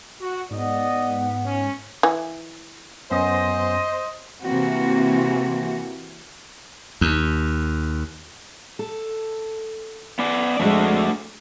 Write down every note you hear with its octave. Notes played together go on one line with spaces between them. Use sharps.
F#4
G#2 B3 D5 D#5
C#4
E3
F#2 B3 C#4 C5 D#5
C3 E3 A#3 C4 F#4
D#2
A4
B3 D5
F2 G#3 A3 D4 F#4